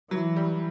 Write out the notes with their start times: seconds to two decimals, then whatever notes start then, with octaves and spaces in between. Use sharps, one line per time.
0.11 E3 F#3
0.36 G3